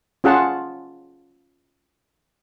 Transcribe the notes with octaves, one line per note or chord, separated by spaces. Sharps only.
C#4 F4 G#4 F#5 A5